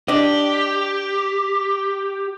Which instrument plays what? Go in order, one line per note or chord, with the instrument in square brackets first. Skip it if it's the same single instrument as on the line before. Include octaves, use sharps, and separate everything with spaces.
[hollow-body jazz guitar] D4 D#5 [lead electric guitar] G4